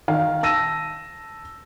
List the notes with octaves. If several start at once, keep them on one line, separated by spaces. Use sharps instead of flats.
D#3 F5
A5 E6 A#6 D#7